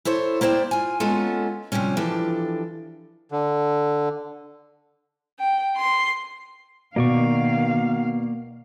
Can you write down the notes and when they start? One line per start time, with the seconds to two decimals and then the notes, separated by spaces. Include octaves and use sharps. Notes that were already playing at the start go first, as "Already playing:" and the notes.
0.05 E4 A4 C5 C#5
0.41 A#3 E4 C5 D5 G5
0.71 F4 G#5
1.00 G#3 A#3 B3 C#4 F4 A4
1.72 C3 D#3 F3 G3 C#4
1.97 E3 F3 D4 G4 A4
3.32 D3
5.40 G5
5.77 C6
6.96 B2 D#3 A#3 D5 F5 C#6